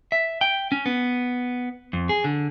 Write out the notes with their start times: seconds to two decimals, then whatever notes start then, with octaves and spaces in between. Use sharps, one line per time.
0.12 E5
0.41 G5
0.72 C#4
0.86 B3
1.93 F2
2.09 G#4
2.24 D3